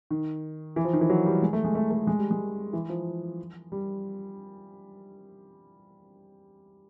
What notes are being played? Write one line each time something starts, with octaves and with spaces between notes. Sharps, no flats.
D#3
E3
F3
D#3
E3
F#3
G3
G#3
A3
G#3
A3
A3
G#3
G3
G#3
E3
F3
G3